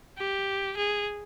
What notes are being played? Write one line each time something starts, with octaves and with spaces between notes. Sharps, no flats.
G4
G#4